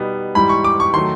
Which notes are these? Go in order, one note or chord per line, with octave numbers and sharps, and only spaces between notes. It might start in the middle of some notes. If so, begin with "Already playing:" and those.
Already playing: B2 G3 B3 D#4
G#2 E3 G3 B5
C#6
D6
C#6
D#3 F#3 A3 C6